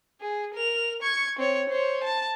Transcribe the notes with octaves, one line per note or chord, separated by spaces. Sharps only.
G#4
A#4 F7
C#6 G#6
C4 C#5
C5 C#5
A5